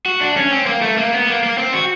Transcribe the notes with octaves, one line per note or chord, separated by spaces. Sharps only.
F#4
D4
C#4
C4
A#3
A3
A#3
B3
A#3
A#3
C4
F#4